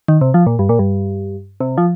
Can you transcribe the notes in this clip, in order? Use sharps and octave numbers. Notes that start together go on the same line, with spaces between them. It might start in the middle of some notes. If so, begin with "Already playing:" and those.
D#3
C3
F3
A#2
G2
A#2
G2
C3
F3